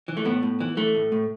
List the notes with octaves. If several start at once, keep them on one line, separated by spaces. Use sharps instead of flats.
E3
A3
A2 B3
A2
E3
E3 A3
A2
A2